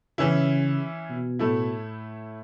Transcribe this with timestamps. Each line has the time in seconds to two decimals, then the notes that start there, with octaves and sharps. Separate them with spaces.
0.18 C#3 E3 C#4 E4
1.10 B2
1.39 A2 A3 E4